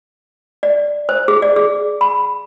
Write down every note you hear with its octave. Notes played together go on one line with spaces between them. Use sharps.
D5
C5
G#4
D5
G#4
B5